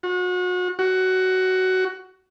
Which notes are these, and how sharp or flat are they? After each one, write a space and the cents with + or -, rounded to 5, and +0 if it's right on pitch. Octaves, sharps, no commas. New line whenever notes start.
F#4 -35
F#4 +15